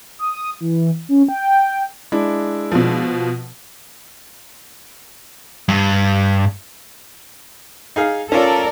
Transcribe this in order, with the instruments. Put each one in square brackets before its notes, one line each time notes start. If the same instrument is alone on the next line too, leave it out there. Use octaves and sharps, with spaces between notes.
[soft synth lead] D#6
E3
C#4
G5
[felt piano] G#3 D4 E4
[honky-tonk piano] B2 F3
[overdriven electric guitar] G2
[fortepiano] D#4 G#4 F5
[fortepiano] C#4 F4 [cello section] A4 A#4 D5